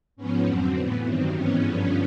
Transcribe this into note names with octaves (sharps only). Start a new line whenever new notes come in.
G#2 F3 B3 C#4
F2 D3 F#3 C4
A2 E3 B3
G2 D#3 F#3 C4
G#2 E3 B3 C#4
G2 D3 F3